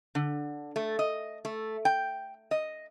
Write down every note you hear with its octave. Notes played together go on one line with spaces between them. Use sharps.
D3
A3
D#5
A3
G5
D#5